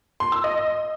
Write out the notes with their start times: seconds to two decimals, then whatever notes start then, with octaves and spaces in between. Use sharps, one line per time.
0.20 C6
0.32 E6
0.44 D#5